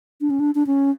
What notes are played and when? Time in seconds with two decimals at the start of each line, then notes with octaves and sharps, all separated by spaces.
0.21 D4
0.30 C#4
0.40 D4
0.55 D4
0.67 C#4